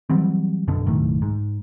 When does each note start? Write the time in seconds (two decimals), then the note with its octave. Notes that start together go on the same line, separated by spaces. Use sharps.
0.10 E3 F#3 G3 C4
0.68 B1 F#2 B2 D3
0.86 F#1 B1 A2 D#3
1.22 G#2